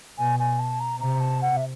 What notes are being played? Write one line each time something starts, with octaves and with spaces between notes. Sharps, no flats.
B2 G#5
G#5
A5
A#5
C3 A#5
A5
F#5
E5